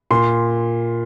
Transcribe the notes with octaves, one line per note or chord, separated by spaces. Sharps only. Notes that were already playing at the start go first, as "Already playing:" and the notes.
A#2 C6